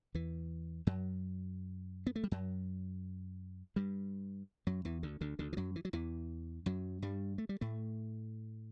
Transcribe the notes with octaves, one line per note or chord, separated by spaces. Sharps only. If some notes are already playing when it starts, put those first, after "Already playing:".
E2 E3
F#2 F#3
B3
A3
G3
F#2 F#3
G2 G3
F#2 F#3
E2 E3
D2 D3
D2 D3
D2 D3
E3
F#2 F#3
E3
F#3
E2 E3
F#2 F#3
G2 G3
A3
G3
A2 A3